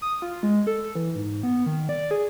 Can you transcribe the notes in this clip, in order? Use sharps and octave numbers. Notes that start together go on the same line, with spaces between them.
D#6
F4
G#3
A4
E3
G#2
B3
D#3
D5
G#4